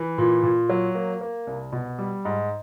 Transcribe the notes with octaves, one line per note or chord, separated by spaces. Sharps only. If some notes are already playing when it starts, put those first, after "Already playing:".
Already playing: E3
A#2
A#2
F#3
A#3
A#3
C2
B2
G3
G#2